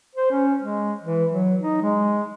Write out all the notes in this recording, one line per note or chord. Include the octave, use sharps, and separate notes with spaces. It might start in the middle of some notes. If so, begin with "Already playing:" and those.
C5
C#4
G#3
E3
F#3
D#4
G#3